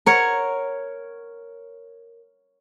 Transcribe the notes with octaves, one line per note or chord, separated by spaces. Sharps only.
A#4 C#5 F#5